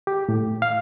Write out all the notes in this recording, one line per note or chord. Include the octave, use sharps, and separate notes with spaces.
G4
A2
F5